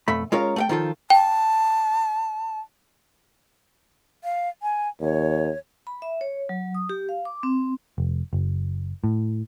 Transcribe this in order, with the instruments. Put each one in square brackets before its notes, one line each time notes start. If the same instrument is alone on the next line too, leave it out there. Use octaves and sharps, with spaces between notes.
[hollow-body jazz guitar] B1 F2 A3 B5
G#3 C#4 F4 A#4 C#5 F5
A3 F5 G5
D#3 F3 F4 A4
[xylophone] G5 [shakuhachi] A5
[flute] F5
G#5
[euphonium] D#2 [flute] C#5
[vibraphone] B5
E5
C#5
F#3
D#6
G4
F5
D6
C4
[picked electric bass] F1
F#1
A2